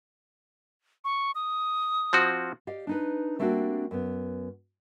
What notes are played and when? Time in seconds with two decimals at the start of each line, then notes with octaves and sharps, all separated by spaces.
1.04 C#6
1.35 D#6
2.13 F3 C4 F#4
2.67 G4 D5 D#5 F5
2.87 D4 D#4 B4
3.39 G3 A3 A#3 C4 D4 F#4
3.91 F#2 B3